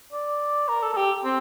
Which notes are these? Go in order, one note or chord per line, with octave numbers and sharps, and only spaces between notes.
D5
A#4
A4
A4
G4
C4